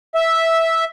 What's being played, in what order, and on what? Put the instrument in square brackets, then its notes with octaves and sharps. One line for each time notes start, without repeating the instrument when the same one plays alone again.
[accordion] E5